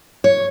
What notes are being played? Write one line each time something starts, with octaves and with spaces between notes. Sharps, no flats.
C#5